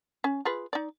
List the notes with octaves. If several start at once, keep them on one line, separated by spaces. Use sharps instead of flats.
C#4
F4 G#4 B4
D#4 D5